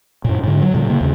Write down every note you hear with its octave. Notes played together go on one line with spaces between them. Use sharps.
F#2 A#2
G#2 D3
F#3
A#2 D3 G3
C#3 A#3
D#2 C#3